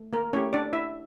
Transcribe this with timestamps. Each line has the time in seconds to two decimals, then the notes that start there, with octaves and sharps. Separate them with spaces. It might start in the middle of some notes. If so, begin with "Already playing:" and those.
Already playing: A3
0.13 A#3 A#4
0.33 A3 C#4 E4 G4 C#5
0.53 D4 D5
0.73 E4 E5